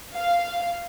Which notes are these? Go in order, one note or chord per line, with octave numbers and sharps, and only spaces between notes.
F5